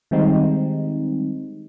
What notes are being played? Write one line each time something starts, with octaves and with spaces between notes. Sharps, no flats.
D#3 G3 G#3 C4 D#4